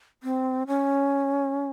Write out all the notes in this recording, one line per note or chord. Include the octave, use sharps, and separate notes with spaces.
C4
C#4